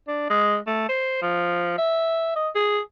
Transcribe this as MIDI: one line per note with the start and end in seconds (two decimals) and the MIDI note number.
0.08 0.25 62
0.30 0.58 56
0.67 0.89 57
0.89 1.17 72
1.22 1.77 53
1.78 2.34 76
2.36 2.49 75
2.55 2.80 68